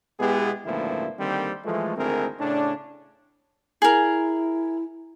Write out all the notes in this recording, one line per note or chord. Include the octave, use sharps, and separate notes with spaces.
B2 G#3 B3 E4 G4 G#4
G#1 D2 A#2 F3 B3 E4
D3 D#3 G3 A#3 C4
E3 F3 G#3 A3
G#1 D2 C4 E4 G#4 A#4
A2 C#3 C#4 D4
E4 G#4 A#4